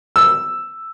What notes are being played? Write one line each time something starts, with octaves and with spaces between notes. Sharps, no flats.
E6